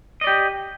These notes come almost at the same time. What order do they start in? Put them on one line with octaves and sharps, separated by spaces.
D#5 D5 G4